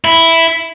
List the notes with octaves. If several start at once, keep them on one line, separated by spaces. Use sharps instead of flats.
E4